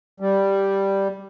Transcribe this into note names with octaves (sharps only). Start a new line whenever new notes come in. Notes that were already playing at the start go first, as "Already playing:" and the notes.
G3